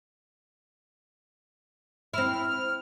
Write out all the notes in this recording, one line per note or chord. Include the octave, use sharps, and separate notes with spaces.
C4 E4 F6